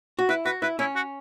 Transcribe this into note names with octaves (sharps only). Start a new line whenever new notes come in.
F#4
E4 B4
F#4 B4
E4 B4
C#4 E4
F#4